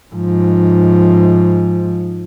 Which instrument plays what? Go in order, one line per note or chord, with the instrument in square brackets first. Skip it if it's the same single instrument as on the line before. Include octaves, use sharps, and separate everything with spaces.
[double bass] G#2 F3